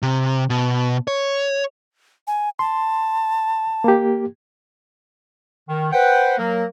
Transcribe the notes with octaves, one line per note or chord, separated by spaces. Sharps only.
C3
B2
C#5
G#5
A5 C6
A#3 G4
D#3
B4 C5 F#5 G5
F#3 A#3 A#4